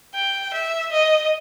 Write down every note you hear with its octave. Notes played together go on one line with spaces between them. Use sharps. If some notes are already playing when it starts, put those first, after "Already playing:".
G5
E5
D#5